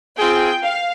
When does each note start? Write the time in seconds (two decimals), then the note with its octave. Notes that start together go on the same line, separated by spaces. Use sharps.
0.17 C4 F4 G#4 G5
0.64 F5